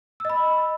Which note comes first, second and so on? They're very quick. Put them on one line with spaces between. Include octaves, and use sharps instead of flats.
E6 D#5 B5